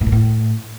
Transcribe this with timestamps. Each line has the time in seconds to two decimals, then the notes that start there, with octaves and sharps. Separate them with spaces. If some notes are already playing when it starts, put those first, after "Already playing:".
0.01 G#2
0.06 A#2
0.12 A2